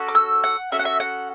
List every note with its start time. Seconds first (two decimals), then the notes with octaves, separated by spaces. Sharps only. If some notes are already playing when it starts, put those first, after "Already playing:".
Already playing: C#4 F#4 A4
0.09 D6
0.15 E6
0.44 F#5
0.72 C#4 F#4 A4 E5
0.79 F#5
0.85 E5
1.00 F#5